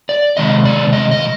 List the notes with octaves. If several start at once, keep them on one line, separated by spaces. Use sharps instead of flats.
D5
C3 D#3 G#3 D#5
D5
D#5
D#5